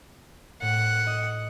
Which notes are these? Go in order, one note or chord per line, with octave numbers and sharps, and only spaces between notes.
A2 F#5
D#5